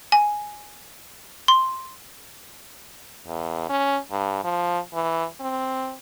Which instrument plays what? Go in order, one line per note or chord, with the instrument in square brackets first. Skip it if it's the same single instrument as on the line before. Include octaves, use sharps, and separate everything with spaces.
[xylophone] G#5
C6
[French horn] E2
C#4
G2
F3
E3
C4